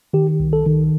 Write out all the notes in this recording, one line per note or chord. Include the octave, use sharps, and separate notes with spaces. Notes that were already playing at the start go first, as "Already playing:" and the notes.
D#3 G4
C2
A4
D#3